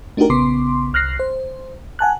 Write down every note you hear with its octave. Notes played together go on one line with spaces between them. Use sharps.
A3 D4 D#4 F#4 G4 A#4
A#1 C#3 B3 C6 D6
C2 F6 F#6 A#6 C7
C5
F#5 G#5 A5 F#6